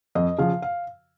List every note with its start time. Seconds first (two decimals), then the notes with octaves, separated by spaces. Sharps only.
0.15 F2 D#5
0.38 C#3 F3 F5
0.62 F5